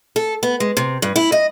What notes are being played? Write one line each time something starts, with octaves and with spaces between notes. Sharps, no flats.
A4
B3
G#3
C3
G2
E4
D#5